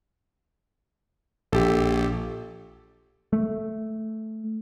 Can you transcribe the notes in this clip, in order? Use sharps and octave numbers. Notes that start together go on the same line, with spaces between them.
A#1 G4 A4
A3